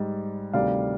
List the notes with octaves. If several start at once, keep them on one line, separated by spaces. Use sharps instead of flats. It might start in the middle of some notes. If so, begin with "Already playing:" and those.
Already playing: G#2 G3
D2 C3 D#3 G3 D5 F5